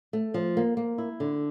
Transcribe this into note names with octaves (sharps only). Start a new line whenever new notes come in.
A3
F3
A#3
A#3
E4
D3